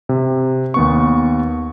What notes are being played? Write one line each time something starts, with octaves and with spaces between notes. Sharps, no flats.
C3
D#2 B3 C#6